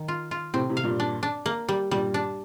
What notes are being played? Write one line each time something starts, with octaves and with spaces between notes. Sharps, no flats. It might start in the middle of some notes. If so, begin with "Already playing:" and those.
Already playing: D#3
F4
F4
A2 C3 C4
A2 C3
F5
G2 A#2
D4
D4
A#3
G3
G2 A#2 G3
D4